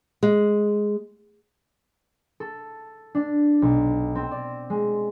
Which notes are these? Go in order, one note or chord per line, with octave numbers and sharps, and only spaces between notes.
G#3
A4
D4
B1
C4
D5
G#3